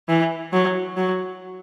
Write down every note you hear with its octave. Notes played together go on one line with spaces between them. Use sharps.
E3
F#3
F#3